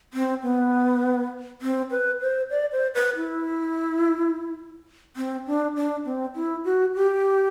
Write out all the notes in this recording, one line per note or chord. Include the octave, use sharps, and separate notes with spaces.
C4
B3
C4
B4
C5
D5
C5
B4
E4
C4
D4
D4
C4
E4
F#4
G4